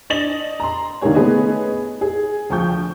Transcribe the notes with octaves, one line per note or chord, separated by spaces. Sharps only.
D4 D#5 A6 A#6 F#7
A#5 C6
D3 D#3 G#3 A#3 G#4 C#5
A3 B3 C#4 G#4 B4 D#5
G#4
D2 F3 G5 C#6 G6